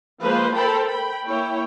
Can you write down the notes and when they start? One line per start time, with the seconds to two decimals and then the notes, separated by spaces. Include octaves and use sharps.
0.22 F3 G#3 A#3 F4 B4 C5
0.54 A4 A#4 C5 G5 A5 B5
0.87 G5 B5
1.26 A#3 E4 C#5 G5